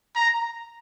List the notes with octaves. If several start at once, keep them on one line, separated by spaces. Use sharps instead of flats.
A#5